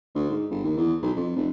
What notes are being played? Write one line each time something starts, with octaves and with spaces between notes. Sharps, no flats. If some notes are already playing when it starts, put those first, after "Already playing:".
D2
G#2
G1
D#2
E2
B1
F2
F1